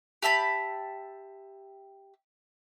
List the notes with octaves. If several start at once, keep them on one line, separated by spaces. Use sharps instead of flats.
G4 E5 A5 B5